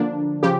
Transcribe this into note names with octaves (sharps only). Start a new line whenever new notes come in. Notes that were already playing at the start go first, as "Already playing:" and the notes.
Already playing: D3 F3 A#3 D4
C#3 F3 G4